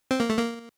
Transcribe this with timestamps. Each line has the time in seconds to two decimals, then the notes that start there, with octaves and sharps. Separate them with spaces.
0.11 C4
0.20 A#3
0.30 A3
0.38 A#3